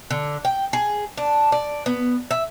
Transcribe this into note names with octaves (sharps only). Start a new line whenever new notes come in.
D3
G5
G#4
D4
D5
B3
E5